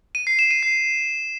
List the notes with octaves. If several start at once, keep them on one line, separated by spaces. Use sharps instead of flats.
D#7
C7
E7
D#7
C7